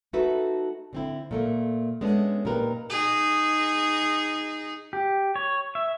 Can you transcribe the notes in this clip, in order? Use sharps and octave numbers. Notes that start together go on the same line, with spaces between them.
A3 D#4 F#4 A4 B4 E5
D3 C4 E4
A#2 A3 A#3
G#3 A3 B3 C#4 D4
A#2 D#4 G4 A#4 B4
D#4 G#4
G4
C#5
E5